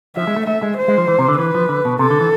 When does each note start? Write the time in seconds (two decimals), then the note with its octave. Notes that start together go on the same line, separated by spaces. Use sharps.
0.16 F3 E5
0.27 G#3
0.36 A3
0.47 A3 E5
0.63 G#3
0.78 C5
0.88 G#3
0.98 F3
1.08 E3
1.19 C3
1.28 D3
1.39 E3 B4
1.55 F3
1.69 D3
1.85 B2
1.99 C3 A4
2.10 D3
2.21 E3